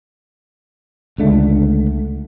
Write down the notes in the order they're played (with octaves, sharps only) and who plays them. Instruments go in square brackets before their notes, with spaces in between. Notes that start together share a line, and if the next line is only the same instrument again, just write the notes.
[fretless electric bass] C#2 D3 A3